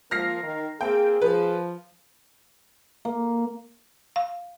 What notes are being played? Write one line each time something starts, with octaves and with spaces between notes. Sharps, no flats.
F3 A#3 F6 A#6 C7
D#3 A#4
A#3 C4 G#4 G5
F3 B4
A#3
F5